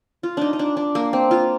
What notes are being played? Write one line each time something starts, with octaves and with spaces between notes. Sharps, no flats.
F4
D4 D#4
D#4
D4
D4
A#3
C4
F4